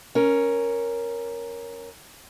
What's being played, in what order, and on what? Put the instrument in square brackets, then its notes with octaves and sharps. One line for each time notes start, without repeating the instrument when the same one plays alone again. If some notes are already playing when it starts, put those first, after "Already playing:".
[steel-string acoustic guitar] C#4 A#4